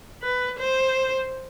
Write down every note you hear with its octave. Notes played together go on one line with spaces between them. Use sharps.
B4
C5